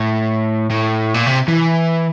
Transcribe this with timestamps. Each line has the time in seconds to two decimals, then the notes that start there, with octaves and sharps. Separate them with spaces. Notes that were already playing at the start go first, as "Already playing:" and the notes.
Already playing: A2
0.70 A2
1.14 A#2
1.26 C3
1.48 E3